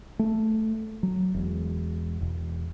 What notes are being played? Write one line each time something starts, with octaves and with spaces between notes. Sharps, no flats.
A3
F#3
E1
E1